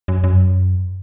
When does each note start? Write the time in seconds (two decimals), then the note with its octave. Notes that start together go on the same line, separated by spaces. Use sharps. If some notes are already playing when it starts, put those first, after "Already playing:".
0.08 F#2
0.24 F#2